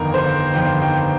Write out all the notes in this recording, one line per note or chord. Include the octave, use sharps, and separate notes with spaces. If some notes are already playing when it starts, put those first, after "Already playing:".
Already playing: G1 F2 D#3 A#4
C5
G1 F2 D#3 G5
G5